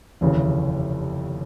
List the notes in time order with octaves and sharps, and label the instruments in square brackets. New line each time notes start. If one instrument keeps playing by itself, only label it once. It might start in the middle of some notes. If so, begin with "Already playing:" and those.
[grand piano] F1 D#2 C#3 E3